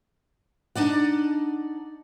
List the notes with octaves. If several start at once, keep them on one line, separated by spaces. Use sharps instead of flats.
D4 D#4 D5 F#5